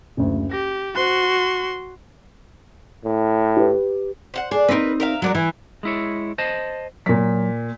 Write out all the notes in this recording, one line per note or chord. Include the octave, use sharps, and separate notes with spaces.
F#1 D2
G4 A#6
F#4 C5 C6 F#6
A2
G4 B4
C5 F5 F#5
D4 G#4
C4 D4 D#4 A#4 B4
A#4 E5 F5
F#3 G#3 D4 A#4
E3 E4
G#3 E4 C#5
C5 D#5 A5
A#2 F#3 B6